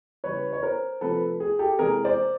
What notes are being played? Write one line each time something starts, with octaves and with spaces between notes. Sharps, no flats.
C#3 E3 G3 B4 C#5
C#5
A#4 C5
C3 F3 A3 A4 B4
G#4
G4 A4
C3 E3 G#3 G#4 A#4
C5 D5